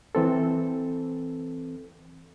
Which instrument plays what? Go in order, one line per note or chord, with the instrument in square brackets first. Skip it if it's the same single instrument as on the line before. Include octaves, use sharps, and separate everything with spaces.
[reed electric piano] E3 C4 A4